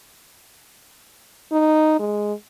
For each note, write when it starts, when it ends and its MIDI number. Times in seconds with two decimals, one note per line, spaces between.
1.52 1.99 63
2.00 2.33 56